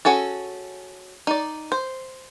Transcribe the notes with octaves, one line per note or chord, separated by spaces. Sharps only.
C#4 F#4 G#4 A4
D#4 D5
C5